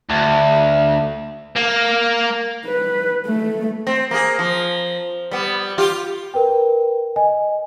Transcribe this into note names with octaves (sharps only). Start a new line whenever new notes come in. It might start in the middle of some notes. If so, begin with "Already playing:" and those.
D2
A#3
B4
A3
C4
A#3 G#4
F3
G3 B3
F4 G4
A#4 B4 G5
D#5 G#5